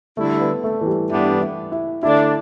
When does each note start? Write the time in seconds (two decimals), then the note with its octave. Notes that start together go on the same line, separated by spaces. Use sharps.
0.17 D3 G3 A3 E4
0.41 B3
0.64 A3
0.82 E3
0.86 G3
1.09 G2 E3 G3 B3 D4 E4
1.41 E4
1.72 E4
2.03 D3 A3 D4 E4